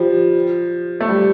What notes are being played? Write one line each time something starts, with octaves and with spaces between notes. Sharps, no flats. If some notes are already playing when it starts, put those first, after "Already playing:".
Already playing: F3 G3
A3
G3